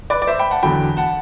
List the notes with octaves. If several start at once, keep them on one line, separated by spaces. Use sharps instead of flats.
B4 D5
D5
C5 E5
G5 B5
F#5 A5
E2 D3 F#3 G5 B5
F#5 A5